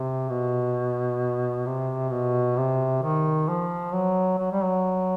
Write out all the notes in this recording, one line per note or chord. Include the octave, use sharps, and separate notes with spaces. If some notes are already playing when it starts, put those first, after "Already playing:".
Already playing: C3
B2
C3
B2
C3
D#3
F3
F#3
F#3
G3
F#3